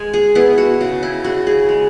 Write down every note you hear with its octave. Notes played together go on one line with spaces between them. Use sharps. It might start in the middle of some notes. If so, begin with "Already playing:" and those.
Already playing: G#3 G#5
G#4
B3 E4
F#4
C#3 F#4
E4
C#3 F#4
G#4
G#3